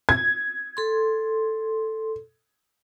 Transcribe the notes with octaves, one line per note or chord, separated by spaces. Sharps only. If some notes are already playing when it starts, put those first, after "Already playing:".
G#6
A4 C6